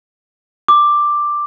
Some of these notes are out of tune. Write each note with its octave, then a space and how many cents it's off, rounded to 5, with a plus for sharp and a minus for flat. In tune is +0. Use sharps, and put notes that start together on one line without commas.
D6 +5